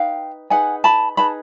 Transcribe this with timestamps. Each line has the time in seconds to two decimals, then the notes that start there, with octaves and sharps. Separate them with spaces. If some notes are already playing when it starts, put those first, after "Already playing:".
Already playing: D#4 B4 F5 G5
0.50 D#4 G#4 B4 F#5 G#5
0.84 A5 B5
1.17 D#4 G#4 B4 A5 B5